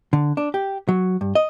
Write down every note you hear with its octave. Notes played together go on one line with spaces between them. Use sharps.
D3
D4
G4
F#3
G2
D#5